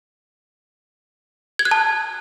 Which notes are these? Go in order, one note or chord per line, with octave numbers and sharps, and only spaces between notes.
G#6
F#6
A5